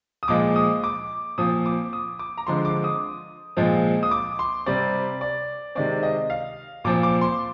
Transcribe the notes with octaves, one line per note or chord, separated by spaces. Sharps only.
D#6
A#2 F3 G#3 D6
D#6
D6
A#2 F3 C4 D#6
D6
D#6
D6
A#5
D3 F3 G#3 C4 C6
D6
D#6
A#2 F3 G#3 C4
D#6
D6
C6
C3 G3 C4 D5
D5
C3 D#3 G#3 C4 D5
D#5
F5
A#2 F3 C4 D6
D6
C6